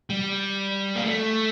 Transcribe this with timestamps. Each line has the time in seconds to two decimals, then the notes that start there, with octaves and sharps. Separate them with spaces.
0.10 G3
0.96 A#3
1.05 A3